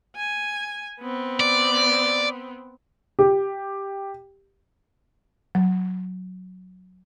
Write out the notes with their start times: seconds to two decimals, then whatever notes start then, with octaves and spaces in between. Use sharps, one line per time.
0.16 G#5
1.01 B3 C4
1.40 D5
3.19 G4
5.55 F#3